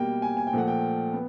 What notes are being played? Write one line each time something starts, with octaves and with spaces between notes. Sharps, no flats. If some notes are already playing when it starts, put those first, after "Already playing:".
Already playing: B2 G3 A#3 G5
G#5
G#5
G5
A#2 F3 A3 F#5
G5
B3